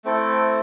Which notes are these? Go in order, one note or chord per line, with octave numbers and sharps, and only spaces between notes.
A3 C4 E4 A4